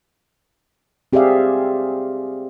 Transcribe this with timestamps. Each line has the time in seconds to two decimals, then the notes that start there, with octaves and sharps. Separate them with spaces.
1.13 C4 G4 G#4 D5 E5 F5